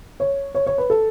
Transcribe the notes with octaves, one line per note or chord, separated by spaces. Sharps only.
C#5
C#5
C#5
B4
A4